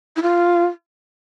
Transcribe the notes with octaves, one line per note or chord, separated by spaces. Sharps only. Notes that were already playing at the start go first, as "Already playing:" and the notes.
E4
F4